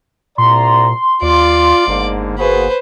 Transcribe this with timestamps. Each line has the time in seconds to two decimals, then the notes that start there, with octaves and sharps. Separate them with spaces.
0.38 C2 A#2 D5 A#5 C6
1.22 D#2 F4 D5 D6
1.87 G1 G#2 D3 A#3
2.38 A#3 F#4 G#4 B4 C5